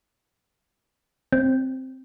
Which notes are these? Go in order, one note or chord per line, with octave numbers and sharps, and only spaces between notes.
C4